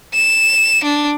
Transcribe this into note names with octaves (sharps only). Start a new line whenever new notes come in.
E7
D4